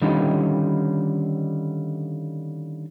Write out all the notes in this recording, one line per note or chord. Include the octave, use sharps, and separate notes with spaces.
D3 D#3 G3 C#4 D#4 F4